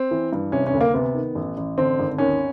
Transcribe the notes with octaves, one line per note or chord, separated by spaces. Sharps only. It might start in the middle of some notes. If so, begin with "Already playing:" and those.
Already playing: C4
E3
G2
C3 C#4
C#4
D2
A#3
C3 B3
D#3
A1
A1
D3 C4
G#1
D#2 C#4